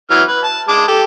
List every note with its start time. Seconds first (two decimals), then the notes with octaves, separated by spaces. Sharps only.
0.11 E3 F#3 F6
0.28 B4
0.44 A5
0.68 G#3 A5 D6
0.88 G4 A4